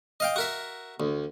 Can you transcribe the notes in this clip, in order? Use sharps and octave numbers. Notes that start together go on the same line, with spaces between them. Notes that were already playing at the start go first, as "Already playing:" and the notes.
D#5 F5 G5
F#4 A#4 E5
D2